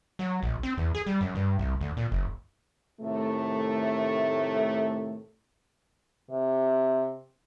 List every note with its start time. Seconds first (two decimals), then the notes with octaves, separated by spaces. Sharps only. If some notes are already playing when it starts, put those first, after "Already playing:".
0.19 F#3
0.43 A#1
0.63 C4
0.77 E2
0.95 G#4
1.07 G3
1.21 F#2
1.35 G2
1.59 C2
1.81 D2
1.97 A#2
2.12 F#1
3.00 A2 C3 D#3 A3
6.31 C3